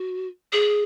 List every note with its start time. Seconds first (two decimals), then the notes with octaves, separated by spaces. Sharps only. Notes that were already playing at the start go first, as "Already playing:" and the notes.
Already playing: F#4
0.53 G#4